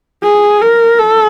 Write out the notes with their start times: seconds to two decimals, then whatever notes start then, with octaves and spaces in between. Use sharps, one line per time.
0.23 G#4
0.62 A#4
0.99 A4